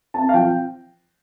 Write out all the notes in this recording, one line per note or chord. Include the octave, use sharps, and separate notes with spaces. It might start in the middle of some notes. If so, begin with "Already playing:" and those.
C4 A5
F5
F3 G5